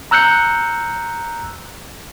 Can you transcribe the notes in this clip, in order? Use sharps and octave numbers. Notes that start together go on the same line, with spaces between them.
A#5 E6 F#6 G6 C#7